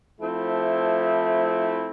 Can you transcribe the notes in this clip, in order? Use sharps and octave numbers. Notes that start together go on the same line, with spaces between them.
F3 A3 C4 E4